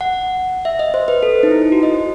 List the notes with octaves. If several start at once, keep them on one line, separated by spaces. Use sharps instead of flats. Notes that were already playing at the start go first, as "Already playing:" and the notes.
F#5
E5
D#5
C5
B4
A4
D#4
E4
E4
F#4
D#5
C5